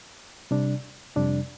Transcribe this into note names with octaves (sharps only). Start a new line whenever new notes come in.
C3 G3 D4
F2 C3 G3 D4